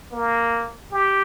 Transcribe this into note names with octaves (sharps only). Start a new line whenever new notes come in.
A#3
G4